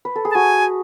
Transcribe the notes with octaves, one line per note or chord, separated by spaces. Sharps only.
B4
A4
G#4
A5
F#4 G#5